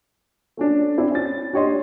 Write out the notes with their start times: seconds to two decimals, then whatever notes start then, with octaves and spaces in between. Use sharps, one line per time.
0.57 A3 C#4 D4
0.98 C4 D4 E4 C5
1.12 C#4 A6
1.53 D4 G4 C#5 D#5 C6